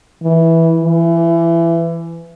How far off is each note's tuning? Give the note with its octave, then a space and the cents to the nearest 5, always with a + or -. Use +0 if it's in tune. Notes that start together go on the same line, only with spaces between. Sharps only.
E3 -10
E3 +25